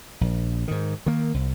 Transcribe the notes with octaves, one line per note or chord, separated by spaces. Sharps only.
A#1
G#2 D#3
D#3 A#3
C2